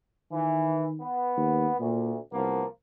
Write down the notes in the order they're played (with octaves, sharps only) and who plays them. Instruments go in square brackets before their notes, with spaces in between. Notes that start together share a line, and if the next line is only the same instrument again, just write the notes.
[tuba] D#3 [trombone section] E3
[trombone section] B3
[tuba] D#2
[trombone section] D2 [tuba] A#2
[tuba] C2 [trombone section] F3 A#3 B3